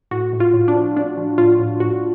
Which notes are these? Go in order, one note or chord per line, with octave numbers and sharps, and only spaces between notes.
A2 F#4
A2
F4
A2
D4
F3
A2 D4
F3
A2 F4
A2
A2 F#4